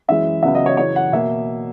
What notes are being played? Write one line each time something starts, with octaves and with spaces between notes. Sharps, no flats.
F#2 E3 G#3 E5
C#2 C#3 F#3 B3 E5
D#5
C#5
F#2 C#3 E3 C#5
F#5
B2 A#3 E5